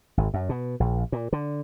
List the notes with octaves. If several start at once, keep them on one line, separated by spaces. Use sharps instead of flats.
G#1
F#2
B2
A#1
A#2
D3